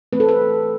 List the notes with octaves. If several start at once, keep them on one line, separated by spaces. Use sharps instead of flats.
E3 A3 C4 B4
A4
B4